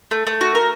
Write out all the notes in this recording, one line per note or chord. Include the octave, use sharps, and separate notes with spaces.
A3
A3
F#4
A#4